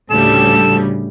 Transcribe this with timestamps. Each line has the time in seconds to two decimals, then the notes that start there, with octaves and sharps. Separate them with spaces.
0.10 D2 A2 C#3 G3 A4 E7